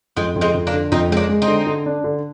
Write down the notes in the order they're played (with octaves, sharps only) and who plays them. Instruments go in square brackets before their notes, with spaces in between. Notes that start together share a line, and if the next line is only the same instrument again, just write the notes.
[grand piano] F2 [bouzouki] G#3 C4
[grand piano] F2
[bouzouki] G#3 C4
[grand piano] F2
[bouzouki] A#3 D4
[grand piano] D3
[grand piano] F2 [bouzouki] C4 D#4
[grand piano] G#3 [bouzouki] C4
[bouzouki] A#3 D4
[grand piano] G#3
[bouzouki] C4 D#4
[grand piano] D3
D3
D4
D3